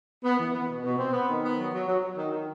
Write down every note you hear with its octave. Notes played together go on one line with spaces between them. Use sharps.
B3
E3
B3
B2
B2
C4
B3
D#3
B3
F#3
F#3
F#3
F#3
D#3
D#3